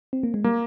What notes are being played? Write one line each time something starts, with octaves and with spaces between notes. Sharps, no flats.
C4
A#3
G#3
G3 A#3